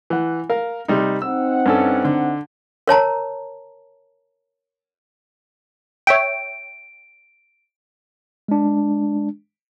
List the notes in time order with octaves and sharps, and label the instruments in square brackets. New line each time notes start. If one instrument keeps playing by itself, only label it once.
[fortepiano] E3 F#5
A#4 F5
C3 G3 D#4
[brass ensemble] C4 D#4 F#5 [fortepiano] E6
[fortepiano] G2 C#4 A4
D3
[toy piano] A#4 C#5 A5 A#5
[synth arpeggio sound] C#5 E5 G5 [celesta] D7
[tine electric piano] G#3 D4